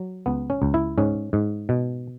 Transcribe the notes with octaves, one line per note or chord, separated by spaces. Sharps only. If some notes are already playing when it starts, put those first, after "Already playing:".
Already playing: F#3
C#2 B3
C#4
C#2
E4
G#2 C#4
G#2
B2